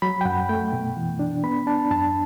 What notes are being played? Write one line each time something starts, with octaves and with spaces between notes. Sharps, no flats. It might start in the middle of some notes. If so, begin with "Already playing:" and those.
F#3 B5
G5
F#2 F#5
A3 G5
B2
E3
D4
B3 B5
D4 A5
F#2 A5